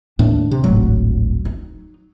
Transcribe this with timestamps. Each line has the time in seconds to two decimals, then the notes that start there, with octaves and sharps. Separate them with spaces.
0.19 D#2 A2 D4
0.51 C3
0.64 D1 G#1 F#3
1.45 D#4